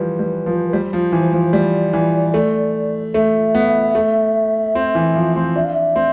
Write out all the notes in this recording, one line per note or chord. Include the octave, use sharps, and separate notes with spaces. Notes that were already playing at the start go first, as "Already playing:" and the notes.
Already playing: E3 F3 G3 B4
G3
F3
B4
G3 C5
F3
E3
F3
C5
G3 D5
E3
A3
A3 E5
B3
A3
C4
E3
F3
C4
D4 E5
F5
E5
C4